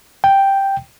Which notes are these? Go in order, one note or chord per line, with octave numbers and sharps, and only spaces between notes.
G5